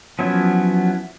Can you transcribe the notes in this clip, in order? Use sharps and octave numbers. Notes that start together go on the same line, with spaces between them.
F3 F#3 B3 C#4 E4